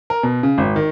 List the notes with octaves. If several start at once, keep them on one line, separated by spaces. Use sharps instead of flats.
A#4
B2
C#3
G#1
D#3